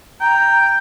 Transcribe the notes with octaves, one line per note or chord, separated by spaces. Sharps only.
G5 A#5